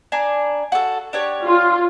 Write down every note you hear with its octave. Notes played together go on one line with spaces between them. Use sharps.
D4 G#5 A#5
F#4 A4
D4 G4 C#5
F4